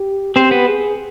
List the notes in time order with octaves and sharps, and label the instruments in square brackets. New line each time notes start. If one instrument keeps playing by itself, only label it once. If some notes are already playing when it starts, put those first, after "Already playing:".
Already playing: [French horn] G4
[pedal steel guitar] C4 C5 [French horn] G4
[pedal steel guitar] B3 B4
[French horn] G#4